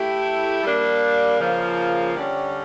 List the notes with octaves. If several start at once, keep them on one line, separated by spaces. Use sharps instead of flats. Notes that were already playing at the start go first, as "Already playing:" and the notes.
Already playing: A3 E4 G4
G3 A#3 D4
C#3 F3 A#3
D3 G3 C#4